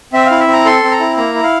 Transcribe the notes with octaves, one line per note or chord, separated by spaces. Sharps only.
C4 E5
E4 F5
E5
C4
A#5
A4 C6
C4
A#5
E4
A#3 A#5
E4
F5